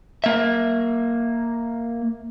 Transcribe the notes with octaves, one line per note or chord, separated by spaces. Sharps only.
A#3 E5